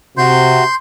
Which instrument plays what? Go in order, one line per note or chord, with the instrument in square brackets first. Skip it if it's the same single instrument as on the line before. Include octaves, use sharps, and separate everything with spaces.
[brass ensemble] C3 [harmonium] F#4 [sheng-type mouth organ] C6 G6